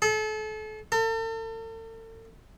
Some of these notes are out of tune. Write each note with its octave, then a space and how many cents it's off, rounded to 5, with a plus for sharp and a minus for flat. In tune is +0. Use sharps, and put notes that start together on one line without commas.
A4 -35
A4 +40